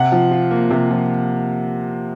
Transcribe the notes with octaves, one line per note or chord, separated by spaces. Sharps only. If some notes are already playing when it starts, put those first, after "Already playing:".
Already playing: C3 F#5
F3
F4
A#3
C3
F3